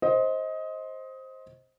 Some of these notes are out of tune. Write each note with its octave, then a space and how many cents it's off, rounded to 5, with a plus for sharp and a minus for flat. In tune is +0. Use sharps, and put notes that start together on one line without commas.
C5 +10 D#5 +20